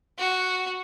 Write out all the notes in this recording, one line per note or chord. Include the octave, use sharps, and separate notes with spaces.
F#4